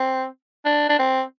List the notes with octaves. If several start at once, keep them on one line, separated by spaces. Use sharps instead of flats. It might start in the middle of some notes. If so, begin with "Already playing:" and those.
Already playing: C4
D4
D4
C4